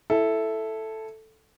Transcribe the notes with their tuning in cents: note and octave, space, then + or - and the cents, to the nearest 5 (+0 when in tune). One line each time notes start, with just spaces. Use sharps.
E4 +0 A4 +0